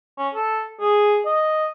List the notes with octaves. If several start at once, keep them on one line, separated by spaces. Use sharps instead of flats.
C#4
A4
G#4
D#5